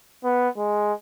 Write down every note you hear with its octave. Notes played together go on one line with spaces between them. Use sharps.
B3
G#3